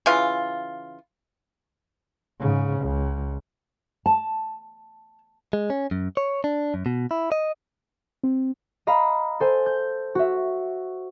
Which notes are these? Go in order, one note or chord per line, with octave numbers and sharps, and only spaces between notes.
C#3 E3 F4
G#2 C#3
C#2
A5
G#3
C#4
F#2
C#5
D4
F#2
B2
E4
D#5
C4
D#5 F5 A#5 B5
A4 C5 G#5
G6
F#4 E5